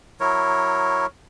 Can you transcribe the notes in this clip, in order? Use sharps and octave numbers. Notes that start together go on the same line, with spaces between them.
F#3 E4 A#4 C#5